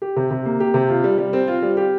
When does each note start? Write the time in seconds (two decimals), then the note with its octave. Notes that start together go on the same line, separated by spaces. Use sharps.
0.02 G4
0.16 C3
0.31 C3
0.45 A#3
0.60 G4
0.74 C3
0.89 F4
1.04 G3
1.18 G3
1.33 C4
1.48 F4
1.62 G3
1.77 G4